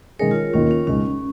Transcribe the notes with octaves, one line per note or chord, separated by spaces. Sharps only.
D#3 G#3 C#4 G#4 A#4 C#5
F4
D#2 D#3 A#3 C#4 F4
C#4
C#2 C#3 G#3 C#4 D#4